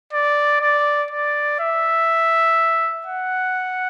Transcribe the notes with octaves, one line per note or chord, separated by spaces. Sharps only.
D5
D5
D5
E5
F#5